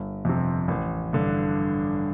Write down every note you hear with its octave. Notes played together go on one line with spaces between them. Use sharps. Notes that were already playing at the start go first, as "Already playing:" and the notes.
Already playing: G1
F2 C3
A1
G2 D3